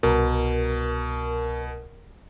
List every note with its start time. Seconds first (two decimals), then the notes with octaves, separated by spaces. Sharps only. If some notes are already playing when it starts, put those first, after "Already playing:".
0.03 C2 B2 A#4